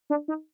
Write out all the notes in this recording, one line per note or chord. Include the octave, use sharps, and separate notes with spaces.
D4
D#4